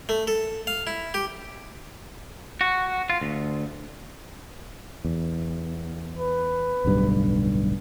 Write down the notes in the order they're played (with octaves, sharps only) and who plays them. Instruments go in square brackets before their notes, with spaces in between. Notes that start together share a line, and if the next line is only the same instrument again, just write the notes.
[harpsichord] A3
A4
F5
E4
G4
[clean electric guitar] F#4
F4
D2
[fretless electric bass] E2
[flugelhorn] B4
[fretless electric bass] D1 B1 G2